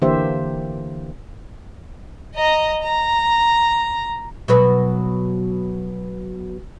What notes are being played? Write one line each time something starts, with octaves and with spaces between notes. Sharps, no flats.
D3 E3 A#3 G4 C5 E5
D#5 A#5
A#5
B2 F#3 B4